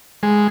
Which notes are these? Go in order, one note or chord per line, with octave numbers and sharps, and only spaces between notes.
G#3